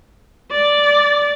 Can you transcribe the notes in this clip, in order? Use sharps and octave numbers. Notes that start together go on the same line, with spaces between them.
D5